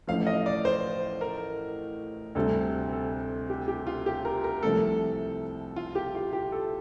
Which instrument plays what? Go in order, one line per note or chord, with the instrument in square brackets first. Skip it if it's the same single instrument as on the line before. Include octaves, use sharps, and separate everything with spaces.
[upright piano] A1 A2 F3 [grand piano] F5
[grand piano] D#5
D5
C5
A#4
[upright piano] D2 C3 G3 [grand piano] A4
[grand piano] A4
G4
G4
F4
G4
A#4
A#4
[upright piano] C2 C3 F3 A3 [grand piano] A4
[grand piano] F4
G4
F4
G4
A4